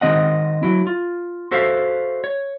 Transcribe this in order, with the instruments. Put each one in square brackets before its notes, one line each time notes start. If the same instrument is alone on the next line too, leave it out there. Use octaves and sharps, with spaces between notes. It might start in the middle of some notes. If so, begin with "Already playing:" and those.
[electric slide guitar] D#3 C4 D#5 F#5
F#3 E4
F4
F#4 A4 C5 E5 F5
C#5